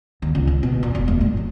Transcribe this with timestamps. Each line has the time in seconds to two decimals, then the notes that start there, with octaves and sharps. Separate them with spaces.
0.22 D#2
0.35 C#2
0.47 C#3
0.63 B2
0.83 A#2
0.95 E1
1.08 A3
1.21 G2
1.37 F#3